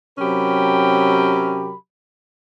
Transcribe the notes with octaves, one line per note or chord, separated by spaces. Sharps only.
C3 F#3 C#4 G4 A#4 B5